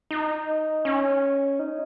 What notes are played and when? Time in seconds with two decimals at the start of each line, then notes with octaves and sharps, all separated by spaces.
0.11 D#4
0.85 C#4
1.59 D#4